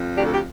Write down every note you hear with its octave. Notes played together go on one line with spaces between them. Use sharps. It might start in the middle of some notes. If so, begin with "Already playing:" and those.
Already playing: F2
D2 D4 G4
A4
G4